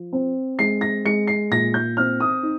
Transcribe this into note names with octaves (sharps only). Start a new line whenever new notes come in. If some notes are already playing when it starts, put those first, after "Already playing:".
Already playing: F3
C4
G#3 C7
A#6
G#3 C#7
C7
A#2 A#6
G6
C4 F6
D#6
D#4